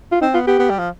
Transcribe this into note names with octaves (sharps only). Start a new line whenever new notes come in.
F4
C4 D#4
B3 F4
B3 G4
B3
G3
F3